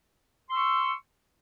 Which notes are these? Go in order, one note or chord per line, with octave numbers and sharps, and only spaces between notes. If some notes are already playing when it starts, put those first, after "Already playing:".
C6 C#6 E6